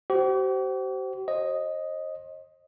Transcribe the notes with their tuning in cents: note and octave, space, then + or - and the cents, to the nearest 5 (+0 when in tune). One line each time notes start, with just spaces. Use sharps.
G4 -45 C5 -5
C5 +40 D#5 +0